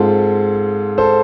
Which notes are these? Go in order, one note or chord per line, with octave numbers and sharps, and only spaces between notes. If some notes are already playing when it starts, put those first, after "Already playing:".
Already playing: G#2 G#3 C4 F4 A4
A4 C5